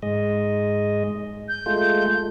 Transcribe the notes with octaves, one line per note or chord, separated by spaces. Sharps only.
G#2 G#3 D#5
G6
G#3 A3 F4